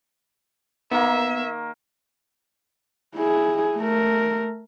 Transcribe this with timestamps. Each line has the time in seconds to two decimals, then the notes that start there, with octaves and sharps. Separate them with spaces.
0.91 D#3 A#3 B3 D#4 E5
3.16 E4 G#4
3.78 A3 A#4